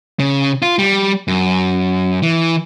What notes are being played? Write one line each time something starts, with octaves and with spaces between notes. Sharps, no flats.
C#3
F4
G3
F#2
E3